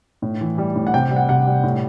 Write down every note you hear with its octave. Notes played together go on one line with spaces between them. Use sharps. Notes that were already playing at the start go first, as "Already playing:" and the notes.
A2
E3
G3
A2
F#5
C3 G5
G3
F#5
C3 F#5
G3
A2